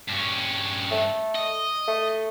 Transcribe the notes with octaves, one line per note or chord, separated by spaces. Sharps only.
G2 C#4
A3
D#5
A3